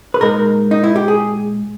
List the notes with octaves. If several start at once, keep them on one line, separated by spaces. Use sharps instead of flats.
B4
A#2 G#3 D#4 A#4
D#4
E4
G4
G#4